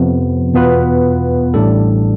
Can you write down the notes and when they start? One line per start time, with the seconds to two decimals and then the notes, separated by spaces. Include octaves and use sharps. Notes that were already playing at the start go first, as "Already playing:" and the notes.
Already playing: F2 C3 F3 B3
0.54 E2 B2 B3 F4 B4
1.54 A1 A2 G3 D4 A4